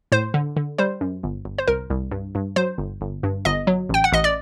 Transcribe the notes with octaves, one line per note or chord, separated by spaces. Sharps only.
A2 C5
D3
D3
G3 C5
F#2
G1
G1
C5
C2 A#4
C2
G2
G2
F#3 C5
G1
G1
G2
G1 D#5
F#3
A1 G5
F#5
A1 D#5
D5